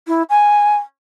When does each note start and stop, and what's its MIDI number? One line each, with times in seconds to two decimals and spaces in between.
0.07 0.22 64
0.29 0.75 80